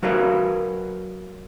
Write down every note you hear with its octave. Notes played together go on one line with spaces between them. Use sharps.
F#3 F#4 A#4 B4 C#5 F5